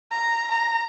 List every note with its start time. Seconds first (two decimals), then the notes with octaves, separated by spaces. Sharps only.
0.11 A#5
0.52 A#5